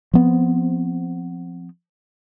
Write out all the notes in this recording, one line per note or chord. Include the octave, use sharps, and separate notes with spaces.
F3 B3 C4